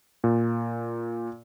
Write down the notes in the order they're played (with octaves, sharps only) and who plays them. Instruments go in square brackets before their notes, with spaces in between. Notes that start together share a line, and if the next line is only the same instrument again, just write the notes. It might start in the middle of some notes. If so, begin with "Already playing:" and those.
[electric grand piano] A#2